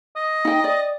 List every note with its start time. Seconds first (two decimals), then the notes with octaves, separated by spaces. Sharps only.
0.16 D#5
0.45 D#4 G5
0.64 D5